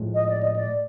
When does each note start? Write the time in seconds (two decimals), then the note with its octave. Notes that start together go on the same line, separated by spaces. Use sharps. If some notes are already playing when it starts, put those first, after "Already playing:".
Already playing: A2 F3 G#3
0.14 D#5
0.29 D5
0.43 D#5
0.56 D5